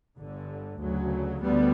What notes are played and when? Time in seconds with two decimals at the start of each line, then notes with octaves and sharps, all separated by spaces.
0.17 G1 G2 D3
0.80 D2 C#3 F#3
1.43 D2 D3 G3 B3